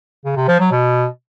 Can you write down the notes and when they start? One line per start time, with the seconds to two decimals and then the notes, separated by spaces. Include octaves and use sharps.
0.25 C#3
0.36 C3
0.48 F3
0.60 F#3
0.71 B2